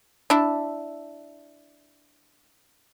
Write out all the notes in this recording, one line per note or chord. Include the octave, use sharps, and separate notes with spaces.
D4 E4